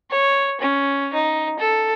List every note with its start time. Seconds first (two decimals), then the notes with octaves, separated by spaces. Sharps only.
0.11 C#5
0.61 C#4
1.14 D#4
1.59 A4